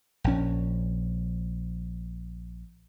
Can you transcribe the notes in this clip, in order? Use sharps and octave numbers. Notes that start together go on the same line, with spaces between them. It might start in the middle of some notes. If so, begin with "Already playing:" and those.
A#1 C#4